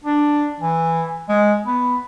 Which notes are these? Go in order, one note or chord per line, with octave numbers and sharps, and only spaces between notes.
D4
E3
G#3
B3